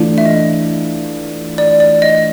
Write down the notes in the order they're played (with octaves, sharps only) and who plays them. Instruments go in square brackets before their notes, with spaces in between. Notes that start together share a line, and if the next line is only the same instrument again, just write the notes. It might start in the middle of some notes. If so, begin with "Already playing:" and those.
Already playing: [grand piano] E3 A3 D4 F4
[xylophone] E5
D#5
D5
D5
D#5